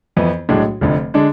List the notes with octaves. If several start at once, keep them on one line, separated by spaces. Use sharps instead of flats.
F2 E3 B3 E4
B1 A2 G#3 D4
F1 F2 D3
D3 G#3 D4